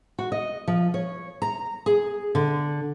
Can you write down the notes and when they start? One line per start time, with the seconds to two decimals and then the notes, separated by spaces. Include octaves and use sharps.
0.19 F#4
0.32 D#5
0.68 F3
0.94 C#5
1.42 A#5
1.86 G#4
2.35 D3